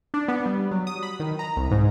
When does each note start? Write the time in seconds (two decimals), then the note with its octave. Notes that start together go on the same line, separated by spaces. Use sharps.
0.14 D4
0.28 B3
0.46 G3
0.71 F#3
0.87 D#6
1.03 B5
1.20 D#3
1.39 A#5
1.56 C2
1.71 G#2